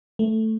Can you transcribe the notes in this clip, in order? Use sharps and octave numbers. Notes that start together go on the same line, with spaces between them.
A3